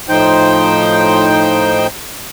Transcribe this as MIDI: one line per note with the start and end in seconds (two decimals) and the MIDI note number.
0.09 1.87 45
0.09 1.87 53
0.09 1.87 63
0.09 1.87 72
0.09 1.87 79